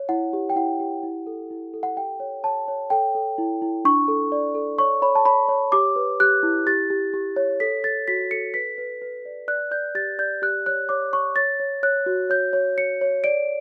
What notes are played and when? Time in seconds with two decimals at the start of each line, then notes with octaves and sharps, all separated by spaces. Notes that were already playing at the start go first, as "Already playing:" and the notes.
Already playing: C#5
0.09 E4 F#5
0.33 G4
0.50 G5
0.56 E4 F#5
0.80 G4
1.03 E4
1.27 A4
1.50 E4
1.74 A4
1.83 F#5
1.97 G4 G5
2.20 C#5
2.44 C#5 A5
2.68 C#5
2.90 A4 G5
3.15 A4
3.38 E4
3.62 E4
3.85 D4 C#6
4.08 A4
4.32 D5
4.55 A4
4.78 C#5 C#6
5.02 C#5 B5
5.15 A5
5.25 C#5 B5
5.49 C#5
5.72 G4 D6
5.96 B4
6.20 G4 F#6
6.43 E4
6.67 G4 A6
6.90 G4
7.14 G4
7.36 C#5
7.60 A4 B6
7.84 A4 A6
8.08 F#4 B6
8.31 A4 C#7
8.54 B4 B6
8.78 B4
9.02 B4
9.25 D5
9.48 D5 F#6
9.71 D5 G6
9.95 G4 A6
10.19 D5 G6
10.42 G4 F#6
10.66 C#5 F#6
10.89 C#5 D6
11.13 C#5 C#6
11.36 C#5 A6
11.60 C#5
11.83 C#5 F#6
12.06 F#4
12.30 C#5 G6
12.53 C#5
12.78 C#5 C#7
13.01 C#5
13.24 D5 D7